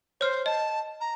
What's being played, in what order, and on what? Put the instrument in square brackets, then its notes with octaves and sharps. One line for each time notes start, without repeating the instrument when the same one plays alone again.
[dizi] C5 [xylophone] C#5 F6
[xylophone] D#5 [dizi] A5
[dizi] A#5